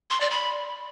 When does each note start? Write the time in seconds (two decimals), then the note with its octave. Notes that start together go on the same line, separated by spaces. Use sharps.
0.10 C6
0.21 D5
0.31 B5